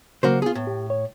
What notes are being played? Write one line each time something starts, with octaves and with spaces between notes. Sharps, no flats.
C#3 F#3 A#3 F#4 C5
B3 F4 G#4
A2
G4
C#5